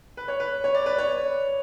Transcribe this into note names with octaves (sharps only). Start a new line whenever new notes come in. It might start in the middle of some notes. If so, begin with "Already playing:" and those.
B4
C#5
B4
C#5
D5
B4
C#5